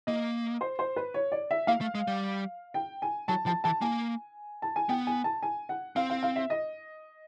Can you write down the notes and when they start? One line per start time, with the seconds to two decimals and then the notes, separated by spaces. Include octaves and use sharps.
0.07 A#3 D#5
0.61 C5
0.79 C5
0.96 B4
1.14 C#5
1.32 D5
1.51 E5
1.67 A#3 F5
1.81 A3
1.95 G#3
2.07 G3
2.74 G5
3.02 G#5
3.28 F#3 A5
3.46 F3 A5
3.64 E3 A5
3.81 A#3 G#5
4.62 A5
4.76 G#5
4.89 B3 G5
5.07 G#5
5.24 A5
5.43 G#5
5.69 F#5
5.96 C4 F5
6.10 F5
6.23 F5
6.36 E5
6.50 D#5